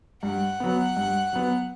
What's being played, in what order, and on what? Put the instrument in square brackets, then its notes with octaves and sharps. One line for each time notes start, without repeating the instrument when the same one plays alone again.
[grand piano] G2 [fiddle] F#5
[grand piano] F#3 B3
G2
F#3 B3